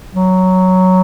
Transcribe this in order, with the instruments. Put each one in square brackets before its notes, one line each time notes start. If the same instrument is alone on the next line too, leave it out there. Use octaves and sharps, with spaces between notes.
[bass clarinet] F#3